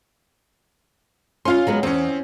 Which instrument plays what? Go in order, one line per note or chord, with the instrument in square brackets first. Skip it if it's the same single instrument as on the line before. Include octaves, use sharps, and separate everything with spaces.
[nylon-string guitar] C#4 F4 [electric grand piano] F5 C6
[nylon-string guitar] F#3 G#3 B3
[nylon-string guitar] E2 [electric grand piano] C4 C#4